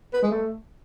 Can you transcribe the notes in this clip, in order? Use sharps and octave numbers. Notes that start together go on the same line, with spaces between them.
B4
G#3
A3